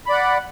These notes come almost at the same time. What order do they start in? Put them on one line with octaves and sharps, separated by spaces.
B5 D5 F#5